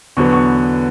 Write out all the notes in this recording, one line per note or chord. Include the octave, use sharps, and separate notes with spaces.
E2 D3 F#3 B3 C#6
C#6